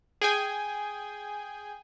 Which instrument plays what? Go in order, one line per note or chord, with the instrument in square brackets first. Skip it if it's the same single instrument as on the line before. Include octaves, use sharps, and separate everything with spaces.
[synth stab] G#4 G5 G#5